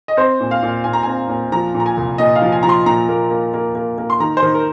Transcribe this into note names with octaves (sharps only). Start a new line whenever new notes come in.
D#5
C4 C5
A#2
F5
A#2
A#2 G#5
A#5
C4 G#5
A#2
F3 A#5
A#2
A#5
G#5
C2
A#2 D#5
F5
F3
G#5
F3 A#5
C6
A#2 A#5
A#3
A#3
A#3
A#3
A#3
C6
D#3 A#5
C5
D#3
A#4